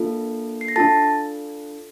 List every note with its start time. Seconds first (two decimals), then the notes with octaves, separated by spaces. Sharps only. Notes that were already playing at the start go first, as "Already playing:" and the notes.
Already playing: A#3 D4 F4 A4
0.61 C7
0.68 A#6
0.76 D4 F4 A4 A5 A6